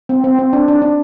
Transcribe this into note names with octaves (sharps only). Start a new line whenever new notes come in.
C4
C4
C4
D4
D4
D4